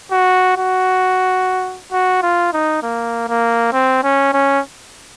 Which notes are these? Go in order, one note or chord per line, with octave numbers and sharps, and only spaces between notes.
F#4
F#4
F#4
F4
D#4
A#3
A#3
C4
C#4
C#4